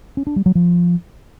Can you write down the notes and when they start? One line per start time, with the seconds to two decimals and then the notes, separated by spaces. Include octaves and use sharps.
0.17 C#4
0.27 D4
0.36 G3
0.46 F#3
0.55 F3